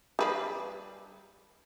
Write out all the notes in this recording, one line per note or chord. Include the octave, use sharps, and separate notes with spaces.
G3 B4 F5